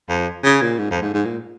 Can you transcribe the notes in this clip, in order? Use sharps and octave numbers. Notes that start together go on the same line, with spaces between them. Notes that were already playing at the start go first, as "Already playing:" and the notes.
F2
C#3
A#2
G#2
F2
G#2
G#2
A#2